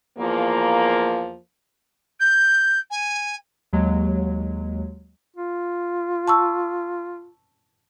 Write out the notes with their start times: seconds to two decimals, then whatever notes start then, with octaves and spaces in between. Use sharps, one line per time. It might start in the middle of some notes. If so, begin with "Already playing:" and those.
0.18 E2 F3 A#3
2.20 G6
2.91 G#5
3.73 D#2 F#3 G#3
5.36 F4
6.28 A5 C#6 E6